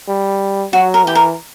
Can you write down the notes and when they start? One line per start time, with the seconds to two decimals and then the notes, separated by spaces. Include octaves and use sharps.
0.09 G3
0.73 F#3 F#4
0.94 A#4
1.05 E3 G4
1.15 A#4